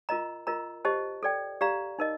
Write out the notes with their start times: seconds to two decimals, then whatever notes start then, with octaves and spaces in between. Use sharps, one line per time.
0.09 F4 A#4 D#5 A#5
0.47 F4 A#4 D#5 A#5
0.85 G4 C5 D#5 A5
1.23 A4 D5 G5
1.61 G4 D5 F5 A#5
1.99 D#4 A#4 D#5